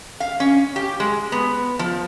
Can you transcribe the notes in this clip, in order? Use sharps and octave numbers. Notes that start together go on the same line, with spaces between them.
F5
C#4
G4
G#3
B3
F3